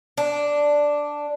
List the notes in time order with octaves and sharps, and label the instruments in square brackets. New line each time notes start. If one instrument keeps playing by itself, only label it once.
[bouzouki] D4